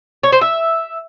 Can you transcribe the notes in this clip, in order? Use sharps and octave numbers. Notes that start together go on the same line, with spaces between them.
C#5
C5
E5